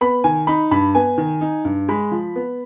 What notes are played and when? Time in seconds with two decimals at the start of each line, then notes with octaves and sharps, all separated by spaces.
0.01 B3 B5
0.24 D#3 G#5
0.47 D#4 B5
0.71 G2 B5
0.95 B3 G#5
1.18 D#3
1.41 D#4
1.65 G2
1.89 G#3 B5
2.12 F3
2.36 B3